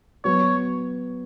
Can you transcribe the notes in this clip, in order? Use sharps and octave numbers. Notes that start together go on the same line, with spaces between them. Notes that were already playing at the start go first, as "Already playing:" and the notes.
F#3 B3 F#4 B4 C#5